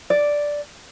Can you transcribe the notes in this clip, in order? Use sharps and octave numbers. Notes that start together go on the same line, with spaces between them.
D5